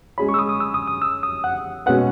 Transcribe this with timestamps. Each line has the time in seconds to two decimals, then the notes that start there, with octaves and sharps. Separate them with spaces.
0.18 G#3 C#4 G#4 C#5 B5
0.29 C#6
0.34 E6
0.39 D#6
0.49 D#6
0.60 E6
0.74 D#6
0.87 D#6
1.02 E6
1.23 D#6
1.44 F#5
1.86 B2 G#3 C#4 F#4 B4 F#5